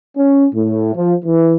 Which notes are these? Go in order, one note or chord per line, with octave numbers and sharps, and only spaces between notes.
C#4
A2
F3
E3